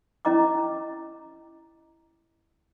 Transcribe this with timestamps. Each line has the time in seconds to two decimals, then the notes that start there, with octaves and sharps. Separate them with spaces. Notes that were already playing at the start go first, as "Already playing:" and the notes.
0.25 C#4 E4 D#5 A#5 D6